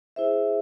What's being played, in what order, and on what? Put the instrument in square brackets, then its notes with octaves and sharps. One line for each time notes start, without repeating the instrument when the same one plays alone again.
[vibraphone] E4 G#4 C5 E5